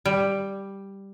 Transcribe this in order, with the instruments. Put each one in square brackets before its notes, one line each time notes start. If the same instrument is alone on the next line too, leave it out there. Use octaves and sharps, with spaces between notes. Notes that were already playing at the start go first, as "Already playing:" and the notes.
[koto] G3